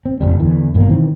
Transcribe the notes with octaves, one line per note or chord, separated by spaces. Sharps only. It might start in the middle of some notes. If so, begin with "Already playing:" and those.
C4
F#1 B1 F2 G3
E2 D3 E3
G#1 G2 B2 A#3
D#3 E3 C4